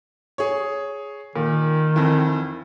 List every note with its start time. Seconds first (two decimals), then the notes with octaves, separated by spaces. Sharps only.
0.38 G#4 C#5
1.36 A#2 D#3
1.96 F2 E3